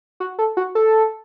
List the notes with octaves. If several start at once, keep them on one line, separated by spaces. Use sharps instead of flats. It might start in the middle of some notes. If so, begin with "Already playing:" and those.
F#4
A4
F#4
A4